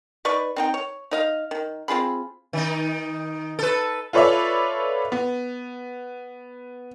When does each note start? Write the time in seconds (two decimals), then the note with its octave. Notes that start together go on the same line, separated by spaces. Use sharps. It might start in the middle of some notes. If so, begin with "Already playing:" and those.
0.25 D#4 B4 D5 C#6
0.56 C4 D#4 G5
0.74 C#5
1.11 D#4 D#5 F5
1.51 D#3
1.88 C4 F4 G#4 B5
2.53 D#3 D#4
3.59 A4 B4
4.13 F4 A4 B4 C#5 D5 E5
5.12 B3